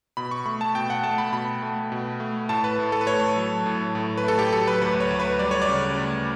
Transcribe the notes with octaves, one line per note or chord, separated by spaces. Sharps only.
B2 B5
C#6
A3 B5
A5
B2 G5
F#5
A3 A5
B5
B2 B5
A3
B2
A3
A2 A5
B4
A2
A4
B4
A3 C#5
F#3
A2
A2
B4
A3 A4
G4
F#3 A4
B4
D2 B4
C#5
D2
B4
G3 D5
C#5
D5
C#3
D2